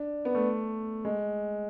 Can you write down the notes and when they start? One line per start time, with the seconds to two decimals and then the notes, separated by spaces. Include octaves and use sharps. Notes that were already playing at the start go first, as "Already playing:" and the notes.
Already playing: D4
0.25 B3
0.35 A3
1.05 G#3